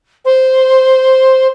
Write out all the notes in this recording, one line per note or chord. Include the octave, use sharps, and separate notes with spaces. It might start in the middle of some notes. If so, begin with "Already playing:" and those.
C5